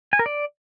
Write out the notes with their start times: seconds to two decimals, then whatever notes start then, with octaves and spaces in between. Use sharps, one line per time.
0.13 G#5
0.19 A#4
0.26 D5